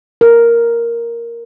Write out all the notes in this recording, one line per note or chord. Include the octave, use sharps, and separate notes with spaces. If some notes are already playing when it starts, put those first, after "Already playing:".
A#4